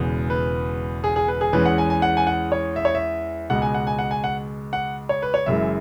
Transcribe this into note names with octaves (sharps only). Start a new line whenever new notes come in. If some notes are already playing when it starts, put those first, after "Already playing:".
Already playing: E1 E2 C#3 G#3 B3
B4
G#4
G#4
B4
G#4
E2 E3 G#3 C#4 B4
F#5
G#5
G#5
F#5
G#5
F#5
C#5
E5
C#5
E5
C#2 B2 G#3 F#5
G#5
F#5
G#5
F#5
G#5
F#5
F#5
C#5
B4
C#5
F#1 F#2 E3 G#3 E5